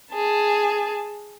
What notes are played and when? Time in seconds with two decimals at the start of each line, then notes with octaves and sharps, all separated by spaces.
0.13 G#4 A5